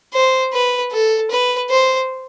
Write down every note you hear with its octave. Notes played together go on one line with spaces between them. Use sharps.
C5
B4
A4
B4
C5